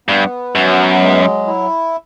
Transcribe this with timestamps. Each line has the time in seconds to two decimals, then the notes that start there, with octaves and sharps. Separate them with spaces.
0.08 G2 B3
0.55 F#2 F#3
1.01 G#3
1.47 E4